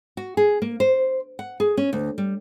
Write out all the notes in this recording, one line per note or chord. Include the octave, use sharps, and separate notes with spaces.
F#4
G#4
A#3
C5
F#5
G#4
C#4
D2
G3